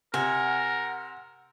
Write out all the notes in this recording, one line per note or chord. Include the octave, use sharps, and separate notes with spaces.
C3 A#4 F#5 G#5